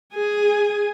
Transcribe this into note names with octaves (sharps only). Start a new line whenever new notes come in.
G#4 G#5